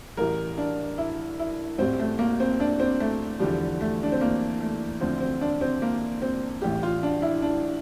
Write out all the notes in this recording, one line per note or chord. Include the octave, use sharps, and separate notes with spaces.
A1 A2 E3 G3 A#4
D4
E4
E4
A1 A2 G3 C4
A3
A#3
C4
D4
C4
A3
E2 D3 F3 G3
A3
D4
C4
A#3
A3
D2 D3 F3 C4
C4
D4
C4
A#3
C4
A1 A2 E3 G3 G4
F4
D4
E4
D4